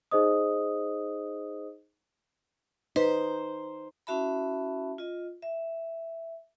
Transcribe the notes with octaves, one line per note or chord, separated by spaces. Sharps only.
D#4 G#4 C5 D#5 D#6
D#4 B4 C5
C#4 E4 F#4 E5 A5 B5
F4 D#5
E5